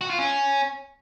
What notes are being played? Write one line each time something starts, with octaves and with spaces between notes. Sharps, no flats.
F#4
F4
C#4